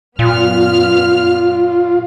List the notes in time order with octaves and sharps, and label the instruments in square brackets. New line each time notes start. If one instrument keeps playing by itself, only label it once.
[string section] F#2 B3 F6 [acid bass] A#2 [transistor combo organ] F4